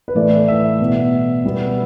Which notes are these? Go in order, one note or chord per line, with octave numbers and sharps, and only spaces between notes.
B4
A2 E3 A3 D5
E5
B2 B3
B2 G3 B3